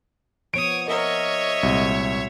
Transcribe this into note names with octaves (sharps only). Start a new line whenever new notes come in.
F3 B3 C#5 D#6 D7
A#4 C#5 D#5 E5
C2 A#2 G#3 F#4